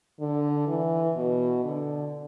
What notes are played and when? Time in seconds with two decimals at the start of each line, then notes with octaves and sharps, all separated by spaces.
0.20 D3
0.68 E3
1.17 B2
1.64 D3